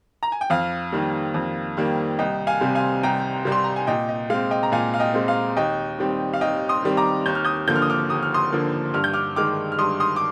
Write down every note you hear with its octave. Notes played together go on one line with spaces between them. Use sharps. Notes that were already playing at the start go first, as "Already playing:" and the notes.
A#5
G#5
G5
F2 F5
D#3 G3 A#3
F2
D#3 G3 A#3
C2 D#5 G5
F5 G#5
C3 G3 C4
F5 G#5
C2 G5 A#5
C3 G3 C4
C6
A#5
G#5
A#2 D#5 G5
D#5
G#3 C4 F5
D#5 G5
A#5
A#2 F5 G#5
F5
D#5 G5
G#3 C4
F5
D#2 D#5 G5
D#3 G3 C4
F5
D#2 D#5 G5
C6 D#6
D#3 G3 C4
A#5 D6
D#2 G6
F6
D#6 G6
D3 F3 A#3 G6
F6
D#6
D6 F6
D#2 D#6
F6
C6 D#6
D3 F3 A#3
G2 F6
G6
D6 F6
D#3 G#3 D6 F6
F6
G2 C6 D#6
C6 D#6
D6